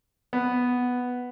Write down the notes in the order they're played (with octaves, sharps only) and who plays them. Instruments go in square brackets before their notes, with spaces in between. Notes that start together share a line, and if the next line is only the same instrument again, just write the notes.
[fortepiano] B3